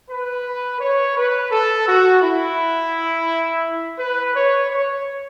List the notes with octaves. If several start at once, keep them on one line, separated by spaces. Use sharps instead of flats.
B4
C#5
B4
A4
F#4
E4
B4
C#5
C#5